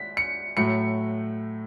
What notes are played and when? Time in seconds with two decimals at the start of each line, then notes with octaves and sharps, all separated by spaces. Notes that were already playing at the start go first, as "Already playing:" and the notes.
Already playing: B6
0.17 C#7
0.57 A2 F#3 A3 C#7